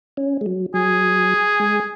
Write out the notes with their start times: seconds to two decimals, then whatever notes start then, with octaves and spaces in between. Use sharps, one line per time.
0.17 C#4
0.41 G#3
0.46 F#3
0.74 F#3 G#4
1.60 G#3